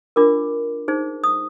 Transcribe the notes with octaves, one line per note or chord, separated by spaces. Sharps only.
D4 F4 A#4 D6
D#4 G#4 C5
D#6